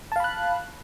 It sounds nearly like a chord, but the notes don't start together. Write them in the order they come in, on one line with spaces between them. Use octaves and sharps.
A5 F5 B5 F#6